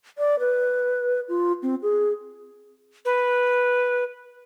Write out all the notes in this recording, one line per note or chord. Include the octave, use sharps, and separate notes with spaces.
D5
B4
F4
C4
G#4
B4